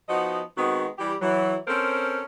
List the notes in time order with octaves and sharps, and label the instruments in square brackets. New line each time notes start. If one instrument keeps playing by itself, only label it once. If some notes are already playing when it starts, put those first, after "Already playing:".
[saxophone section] F3 B3 D#4 F#4 D#5
D#3 G#3 B3 C4 F#4
E3 G3 G4
E3 F#3
C4 C#4 A4 A#4 C5